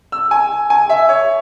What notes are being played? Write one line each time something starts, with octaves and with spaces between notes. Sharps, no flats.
E6
G#5
G#5
E5
C#5